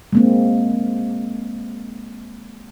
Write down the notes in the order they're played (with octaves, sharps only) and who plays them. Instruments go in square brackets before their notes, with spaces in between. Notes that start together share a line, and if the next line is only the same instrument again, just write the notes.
[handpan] G#3 A#3 C4